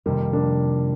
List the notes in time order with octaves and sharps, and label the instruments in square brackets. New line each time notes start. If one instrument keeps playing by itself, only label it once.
[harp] F2 C3 D#3 [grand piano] G3 A#3
[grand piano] A#3 D4